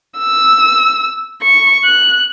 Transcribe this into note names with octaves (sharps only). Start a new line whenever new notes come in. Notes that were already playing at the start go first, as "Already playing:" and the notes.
E6
C#6
F#6